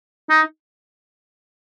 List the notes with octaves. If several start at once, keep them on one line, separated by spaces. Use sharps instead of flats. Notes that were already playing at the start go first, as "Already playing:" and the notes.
D#4